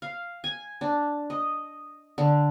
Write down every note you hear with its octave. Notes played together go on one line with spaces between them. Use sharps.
F5
G#5
D4
D#5
D3